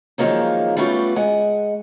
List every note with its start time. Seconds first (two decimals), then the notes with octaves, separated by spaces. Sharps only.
0.18 F#2 D#3 F3 G#3 A#3 C#4
0.77 G3 A3 B3 C#4 D#4 F4
1.16 G#3 F#5 G#5